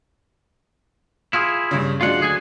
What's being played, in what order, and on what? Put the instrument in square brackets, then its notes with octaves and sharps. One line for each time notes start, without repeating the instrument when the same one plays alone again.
[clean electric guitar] E4 F4 G#4
[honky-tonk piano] G2 C#3
[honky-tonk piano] F#3 G#3 D4 [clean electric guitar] F4 F#5
[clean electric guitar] D2 G#4 G#5